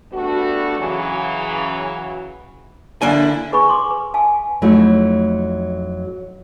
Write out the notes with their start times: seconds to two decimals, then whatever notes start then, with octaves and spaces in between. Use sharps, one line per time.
0.13 G3 A3 B3 D4 F#4
0.79 C#3 E3 F#3
3.02 D3 A#3 D4 E4 G#5
3.53 G#4 B4 G#5 B5 C#6
3.69 C6 D6
3.90 B4
4.14 F5 G#5 A5
4.62 F2 F#3 A3 D#4 E4